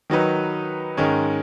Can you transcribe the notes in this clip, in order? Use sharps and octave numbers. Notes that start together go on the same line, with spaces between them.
D#3 F#3 D#4 B4
G#2 D#3 G#3 C#4